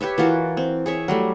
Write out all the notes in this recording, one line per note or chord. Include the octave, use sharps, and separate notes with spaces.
G4 B4 C#5 E5
E3 F4 F#4 A#4
C4
G#4 C#5 E5
F#3 G3 A3